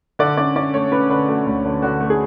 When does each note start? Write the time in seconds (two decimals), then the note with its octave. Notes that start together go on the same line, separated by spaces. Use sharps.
0.19 D3 D5
0.37 C#4 D5
0.56 C#4 D5
0.74 A3 C#5
0.92 C#4 B4
1.10 D3 B4
1.28 A3 F#4
1.46 D2
1.65 D3
1.82 D3 F#4
2.00 A3
2.10 G#4